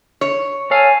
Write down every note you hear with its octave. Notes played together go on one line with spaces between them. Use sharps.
C#5
A4 C#5 F5 G#5